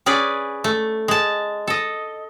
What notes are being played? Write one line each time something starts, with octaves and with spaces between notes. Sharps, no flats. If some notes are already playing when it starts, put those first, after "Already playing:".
C#4 G#4 B4 D5
A3
G#3 A5
A4 D#5